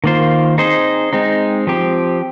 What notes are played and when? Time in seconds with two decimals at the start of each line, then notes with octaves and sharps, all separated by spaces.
0.04 D#3 A#3 F4 C5
0.58 C4 D#4 G#4 C5 D#5
1.13 G#3 C4 D#4
1.67 F3 C4 G4